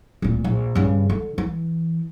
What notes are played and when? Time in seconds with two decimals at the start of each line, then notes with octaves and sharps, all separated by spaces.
0.22 D1 A#2
0.44 A#1
0.75 G2 C#3
1.10 D3
1.38 E3